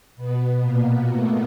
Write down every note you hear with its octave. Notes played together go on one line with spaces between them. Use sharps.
B2 B3
A#2 A#3
A2 A3